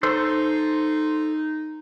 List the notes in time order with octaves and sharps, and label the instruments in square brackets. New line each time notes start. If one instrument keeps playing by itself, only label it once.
[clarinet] D#4 [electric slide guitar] A4 C5